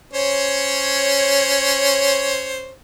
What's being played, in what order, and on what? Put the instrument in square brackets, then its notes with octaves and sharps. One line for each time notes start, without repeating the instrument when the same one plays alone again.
[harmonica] C#4 C5 C#5